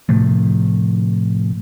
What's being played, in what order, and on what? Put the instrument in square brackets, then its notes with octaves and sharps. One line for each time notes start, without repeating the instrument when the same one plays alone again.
[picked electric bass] A2 C3 F3 A3